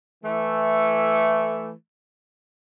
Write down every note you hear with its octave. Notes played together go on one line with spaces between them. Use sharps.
E3 A3